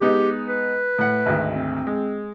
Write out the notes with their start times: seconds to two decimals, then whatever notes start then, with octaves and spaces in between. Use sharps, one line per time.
0.01 G#3 B3 D#4 G4
0.48 B4
0.99 A2 F#5
1.26 G#1 D2 D#3
1.56 C4
1.87 G#3